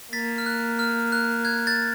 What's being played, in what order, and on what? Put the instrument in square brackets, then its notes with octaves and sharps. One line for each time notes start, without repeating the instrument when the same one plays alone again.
[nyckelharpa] A#3 [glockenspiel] A6 B6
[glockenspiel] F6
F#6
F6
F#6
F#6 G#6
G6 A6